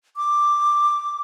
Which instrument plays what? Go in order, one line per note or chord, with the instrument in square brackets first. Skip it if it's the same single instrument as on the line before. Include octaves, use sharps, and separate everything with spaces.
[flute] D6